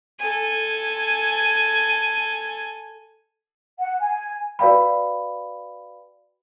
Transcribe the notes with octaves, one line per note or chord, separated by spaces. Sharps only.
A4 G#5
F#5
G#5
F#4 B4 D5 F5 G5 B5